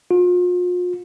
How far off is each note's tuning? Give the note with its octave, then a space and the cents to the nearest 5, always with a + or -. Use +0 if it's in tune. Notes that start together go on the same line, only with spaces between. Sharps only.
F4 +40